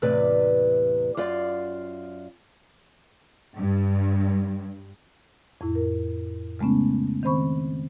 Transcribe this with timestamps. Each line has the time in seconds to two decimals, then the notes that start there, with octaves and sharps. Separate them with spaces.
0.02 E2 A2 C3 B4 D5
1.17 F#2 F4 D5 F5
3.58 G2
5.61 F2 A2 E4
5.75 A#4
6.59 C#3 G#3 A3 B3 C#4
7.23 D#3 C4 C5 B5 C#6